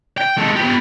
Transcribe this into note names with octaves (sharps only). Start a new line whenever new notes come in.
G5
G#3 A4
B3 G4